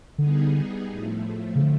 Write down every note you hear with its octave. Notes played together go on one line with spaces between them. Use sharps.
D3 G3 B3 D#4 G#4
A2 F3 A3
C#3
D3